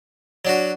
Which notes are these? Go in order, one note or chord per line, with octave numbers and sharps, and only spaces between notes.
F#3 D4 F#4